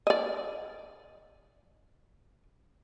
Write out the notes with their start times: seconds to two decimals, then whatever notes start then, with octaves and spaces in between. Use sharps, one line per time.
0.07 D5 D#5